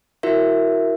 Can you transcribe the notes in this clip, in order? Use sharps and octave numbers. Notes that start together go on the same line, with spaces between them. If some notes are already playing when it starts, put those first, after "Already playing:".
E4 F#4 A#4 E5